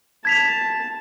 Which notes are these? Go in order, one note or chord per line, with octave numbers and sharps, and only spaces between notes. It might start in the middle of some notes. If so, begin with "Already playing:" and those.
A5 G#6 B6 F7